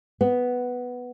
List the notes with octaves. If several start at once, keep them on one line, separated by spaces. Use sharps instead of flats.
B3